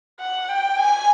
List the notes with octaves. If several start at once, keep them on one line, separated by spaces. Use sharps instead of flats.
F#5
G5
G#5